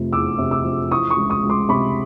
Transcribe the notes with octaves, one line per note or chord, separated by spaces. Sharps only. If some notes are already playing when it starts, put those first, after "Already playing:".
Already playing: F1 C3 F3
E2 D6 E6
C3
D6 E6
F3
E3 C#6 D#6
C#6 D#6
C#2
C#6 D#6
C#2
C6 D6
C3 B5 C#6